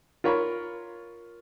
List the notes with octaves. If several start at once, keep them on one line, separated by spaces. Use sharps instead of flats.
F4 A#4 C#5 B5